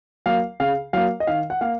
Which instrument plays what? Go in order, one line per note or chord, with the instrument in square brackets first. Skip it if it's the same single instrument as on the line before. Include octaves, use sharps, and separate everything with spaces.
[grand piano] F#3 A#3 F5
C#3 F5
F#3 A#3 F5
D#5
D#3 F5
F#5
A#3 F5